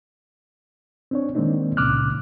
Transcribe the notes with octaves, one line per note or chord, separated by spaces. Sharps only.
C4 D4 C#5
D#3 G#3 A#3 C4 D4 D#4
C#2 A#2 C#3 D6 F6 F#6